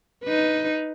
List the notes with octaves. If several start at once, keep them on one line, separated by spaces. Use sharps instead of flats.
D#4 B4